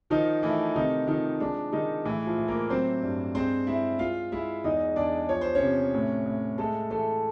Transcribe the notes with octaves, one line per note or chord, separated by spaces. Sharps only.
D#3 F3 D#4
E3 A3 E4
C3 D#3 D#4
D#3 F3 D#4
G#3 D4
D#3 G#3 D#4
A2 E3 E4
F3 F4
A2
A#3 A#4
F#3 C4 C5
G2
G#3 C4 C5
G#3 E4 E5
G#3 F4 F5
G#3 E4 E5
E2 D#4 D#5
E2 D4 D5
F3 C#5
C5
C#4 C#5
C3
A2
A2
G#3 A3 A4
E3 A3 A4